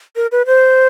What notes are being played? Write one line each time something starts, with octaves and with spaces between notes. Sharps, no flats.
A#4
B4
C5